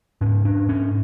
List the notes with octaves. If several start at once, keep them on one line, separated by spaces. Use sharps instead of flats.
G#2 C#4
D4
G#2
C#4